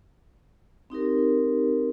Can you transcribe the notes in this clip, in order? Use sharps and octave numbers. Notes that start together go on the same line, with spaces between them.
C4 D#4 G4 A#4